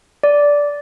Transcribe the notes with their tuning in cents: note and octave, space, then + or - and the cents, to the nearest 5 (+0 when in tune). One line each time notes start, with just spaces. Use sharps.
D5 -10